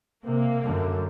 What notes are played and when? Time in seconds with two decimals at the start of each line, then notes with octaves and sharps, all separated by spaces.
0.24 C3 A#3
0.63 F#2 D3